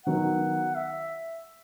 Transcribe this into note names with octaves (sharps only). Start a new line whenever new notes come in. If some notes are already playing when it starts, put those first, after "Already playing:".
D#3 F#3 B3 F#5
E5